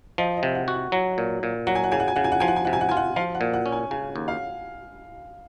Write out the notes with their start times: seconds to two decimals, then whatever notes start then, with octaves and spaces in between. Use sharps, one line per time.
0.18 F3 D#5
0.37 D#5
0.43 C3
0.55 F#5
0.68 F#4
0.74 F#5
0.92 F#3 F#5
1.18 A#2
1.43 A#2
1.67 F#3 F#5
1.75 G#5
1.84 F#5
1.92 C#3 G#5
2.00 F#5
2.08 G#5
2.16 C#3 F#5
2.24 G#5
2.32 F#5
2.40 F3 G#5
2.48 F#5
2.56 G#5
2.65 C3 F#5
2.73 G#5
2.81 F#5
2.89 F4 G#5
2.97 F#5
3.16 F3 F5
3.35 F#5
3.41 A#2
3.53 F#5
3.66 C#4
3.72 G#5
3.91 C#3 G#5
4.16 D#2
4.28 F5